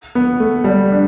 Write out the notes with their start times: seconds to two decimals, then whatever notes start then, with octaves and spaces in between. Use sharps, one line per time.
0.15 B3
0.40 A3
0.64 G3
0.92 D4